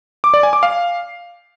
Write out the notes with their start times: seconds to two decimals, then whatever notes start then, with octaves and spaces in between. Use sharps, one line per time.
0.24 D6
0.34 D5
0.43 G#5
0.53 D6
0.63 F5